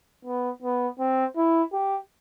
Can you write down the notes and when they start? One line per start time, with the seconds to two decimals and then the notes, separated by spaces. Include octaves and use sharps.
0.25 B3
0.62 B3
0.99 C4
1.37 E4
1.73 G4